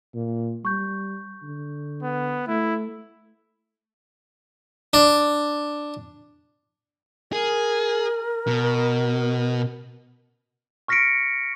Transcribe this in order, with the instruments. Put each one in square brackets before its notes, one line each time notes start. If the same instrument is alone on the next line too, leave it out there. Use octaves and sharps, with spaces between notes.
[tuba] A#2
[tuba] G3 [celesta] C#6 G6
[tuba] D3
[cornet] B3
[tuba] A3 [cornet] E4
[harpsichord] D4
[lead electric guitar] G#4 [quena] A#4
[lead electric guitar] B2
[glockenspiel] C#6 F6 A#6 B6 C#7 D7